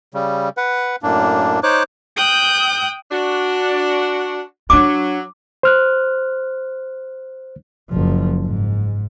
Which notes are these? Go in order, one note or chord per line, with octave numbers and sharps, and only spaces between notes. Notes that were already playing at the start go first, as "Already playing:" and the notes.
C#3 G3
B4 F#5
F#2 A2 A#3 D4
D#4 C5 C#5 D6 F#6
G5 D#6 F#6 G6
D4 F#4
F#3 D4 F4 D6
C5 F6 F#6
F#1 F3
G#2